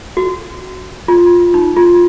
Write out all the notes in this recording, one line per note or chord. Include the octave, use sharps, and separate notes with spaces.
F#4
F4
D#4
F4